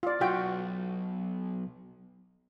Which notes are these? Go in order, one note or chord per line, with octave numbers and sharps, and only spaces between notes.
F4 D5
B1 F4 F#4 G5